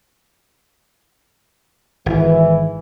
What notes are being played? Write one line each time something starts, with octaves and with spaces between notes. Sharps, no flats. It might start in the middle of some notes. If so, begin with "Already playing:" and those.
G#1 E3